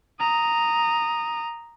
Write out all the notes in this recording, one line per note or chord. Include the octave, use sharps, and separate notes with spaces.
A#5 D#6